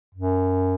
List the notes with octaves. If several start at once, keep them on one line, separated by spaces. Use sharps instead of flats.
F#2